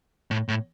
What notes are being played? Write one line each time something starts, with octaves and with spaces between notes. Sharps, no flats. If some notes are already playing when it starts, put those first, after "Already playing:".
A2
A2